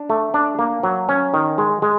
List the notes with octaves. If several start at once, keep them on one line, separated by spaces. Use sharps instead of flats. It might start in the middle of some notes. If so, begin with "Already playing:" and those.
Already playing: D4
A3
D4
A#3
F#3
C#4
D#3
G#3
G#3